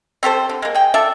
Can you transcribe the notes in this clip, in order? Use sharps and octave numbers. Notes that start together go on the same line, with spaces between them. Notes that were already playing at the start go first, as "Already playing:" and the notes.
C4 G4 A4 C5
D3
G#3 A#3
G#4 G5
F4 A4 D5 E5